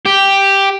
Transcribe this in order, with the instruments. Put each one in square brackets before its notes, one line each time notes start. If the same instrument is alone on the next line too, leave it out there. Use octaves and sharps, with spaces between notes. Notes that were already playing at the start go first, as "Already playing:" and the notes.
[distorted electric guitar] G4